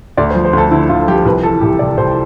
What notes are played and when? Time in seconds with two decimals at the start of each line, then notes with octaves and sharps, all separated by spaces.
0.17 D2 D5
0.31 C5
0.35 F3
0.45 C5
0.53 D2
0.58 A4
0.71 D3 E4
0.89 D2 F4
1.08 F3 G4
1.25 C2 B4
1.43 E3 A4
1.61 C2 G4
1.79 C3 D5
1.97 C2 C5